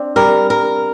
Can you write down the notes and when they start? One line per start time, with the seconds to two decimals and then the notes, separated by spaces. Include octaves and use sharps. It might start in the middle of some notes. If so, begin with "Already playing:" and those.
Already playing: C4 D4
0.16 G3 A#4
0.50 A#4